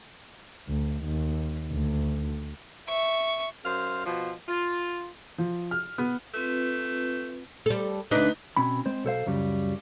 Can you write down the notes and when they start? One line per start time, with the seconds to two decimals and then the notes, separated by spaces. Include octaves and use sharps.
0.68 D2
1.04 D#2
1.72 D2
2.88 E5 C#6
3.65 F#2 C5 F5
4.05 B2 F3
4.48 F4
5.38 F3
5.71 F6
5.98 B3
6.34 A3 C4 F4 B4
7.66 G3 A4
8.11 D2 D4 D#4 B4
8.57 B2 C4 C#4 B5
8.86 G#3 C4 C5
9.04 B1 A4 C5 F5
9.26 C#2 F#2 C#3 G3